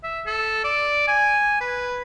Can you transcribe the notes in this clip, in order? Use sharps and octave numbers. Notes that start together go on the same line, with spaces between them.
E5
A4
D5
G#5
B4